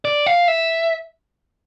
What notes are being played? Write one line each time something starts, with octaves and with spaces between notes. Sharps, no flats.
D5
F5
E5